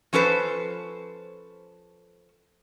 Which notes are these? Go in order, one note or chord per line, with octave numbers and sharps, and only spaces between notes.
F3 C#4 A4 B4 C5